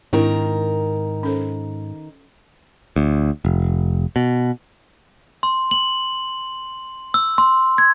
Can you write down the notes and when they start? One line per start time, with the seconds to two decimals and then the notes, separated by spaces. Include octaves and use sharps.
0.13 G#2 D#3 C4 D4 E4 A#4
1.23 C#4 A4 C5
2.96 D2
3.45 F1
4.16 B2
5.43 C6
5.71 F#7
7.14 E6
7.38 C6
7.78 G#6